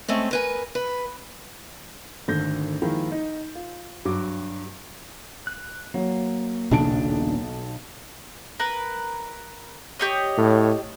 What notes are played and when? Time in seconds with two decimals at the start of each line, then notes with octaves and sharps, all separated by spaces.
0.08 G#3 A3 C4 C#4
0.31 A#4 B4 G#5
0.75 B4
2.28 G#1 D3 A3 G6 A#6
2.82 D#3 F3 G#3 A#3 E4
3.12 D#4
3.55 F4
4.05 G2 F#3 F#4 D6
5.47 F#6
5.94 F#3 A#3
6.71 D#1 B1 C#3 D4 A5 D7
8.60 A#4 B4
9.99 G4 C#5 D#5
10.37 A2